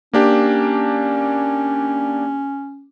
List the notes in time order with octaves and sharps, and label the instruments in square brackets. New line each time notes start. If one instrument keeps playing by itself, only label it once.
[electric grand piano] A#3 D4 G4 [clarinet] C#4